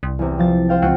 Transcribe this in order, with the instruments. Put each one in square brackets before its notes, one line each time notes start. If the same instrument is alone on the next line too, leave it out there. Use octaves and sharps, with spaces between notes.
[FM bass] C2
[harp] E2 C3
F3 A6
C5 F5 G5
[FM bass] C#2 [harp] C4 F4 F#5